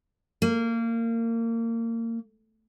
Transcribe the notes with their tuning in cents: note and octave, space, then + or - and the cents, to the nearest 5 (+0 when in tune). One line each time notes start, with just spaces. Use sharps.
A#3 -25